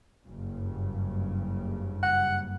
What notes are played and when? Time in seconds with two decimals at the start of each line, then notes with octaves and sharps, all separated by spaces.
0.25 F#1 G2 C#3
2.03 F#5